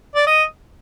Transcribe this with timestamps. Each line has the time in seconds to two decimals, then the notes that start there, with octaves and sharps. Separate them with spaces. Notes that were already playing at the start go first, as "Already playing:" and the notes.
0.16 D5
0.27 D#5